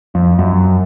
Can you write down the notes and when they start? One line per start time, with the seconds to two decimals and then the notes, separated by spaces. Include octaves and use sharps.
0.15 F2
0.39 F#2